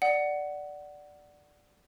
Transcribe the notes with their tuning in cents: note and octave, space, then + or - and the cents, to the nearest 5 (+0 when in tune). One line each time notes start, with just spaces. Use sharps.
D5 +0 F#5 +10